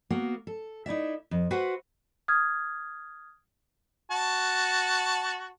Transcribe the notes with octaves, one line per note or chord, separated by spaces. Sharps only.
A#3 B3 F#4
A4
D#4 E4 D5 E5
F2
F#4 B4 C5 E5 F#5
D#6 F6 G#6
F#4 A5